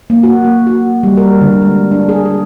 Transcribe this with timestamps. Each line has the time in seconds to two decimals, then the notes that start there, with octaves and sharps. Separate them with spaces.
0.10 A#3
0.23 F#4
0.45 A#3
0.67 F#4
1.03 G3
1.17 A#4
1.41 D3
1.62 G#3
1.92 D4
2.09 G#4
2.25 G#4